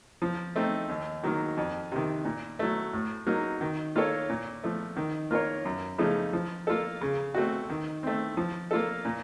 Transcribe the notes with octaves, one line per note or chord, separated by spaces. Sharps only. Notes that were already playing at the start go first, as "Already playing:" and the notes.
F3
A3 C4 D#4
D#2
D#3 F#3 A#3
F2
C3 D#3
A#2
F#3 A3
A2
F#3 A#3 D#4
D#3
A#3 F4 A4 C#5
A#2
F3 A3
D#3
A#3 F4 A#4 C#5
F#2
C#3 F3 A3 D#4
F3
A#3 F4 A4
C#3
A3 C4 F#4
D#3
A3 C4
F3
A#3 F4 A4
A#2